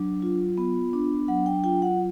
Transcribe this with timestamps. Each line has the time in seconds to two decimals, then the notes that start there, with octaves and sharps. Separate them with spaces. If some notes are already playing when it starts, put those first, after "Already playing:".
Already playing: F#3 D4
0.22 F4
0.58 B3
0.93 D4
1.28 F#3 F#5
1.46 G5
1.64 F4 G5
1.82 F#5